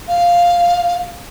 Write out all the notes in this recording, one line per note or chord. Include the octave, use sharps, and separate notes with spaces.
F5